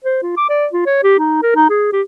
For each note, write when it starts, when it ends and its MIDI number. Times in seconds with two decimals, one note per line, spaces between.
0.04 0.21 72
0.23 0.36 65
0.37 0.47 86
0.49 0.67 74
0.73 0.84 65
0.86 1.00 73
1.03 1.18 67
1.19 1.42 63
1.43 1.53 70
1.56 1.69 63
1.70 1.90 68
1.93 2.02 67